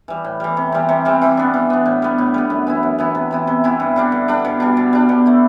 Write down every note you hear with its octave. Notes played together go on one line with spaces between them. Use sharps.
E3 G3
A2
E3 G3
C3
E3 G3 C4
C3
E3 G3 C4
E3
B3 D4
E3
B3 D4
A2
G3 B3
A2
G3 B3
F#2
E3 B3 E4
F#2
E3 B3 E4
C3
E3 B3 E4
C3
E3 B3 E4
G2
D3 G3 D4
G2
D3 G3 D4
B2
G3 D4
B2
G3 D4
B2
A3 E4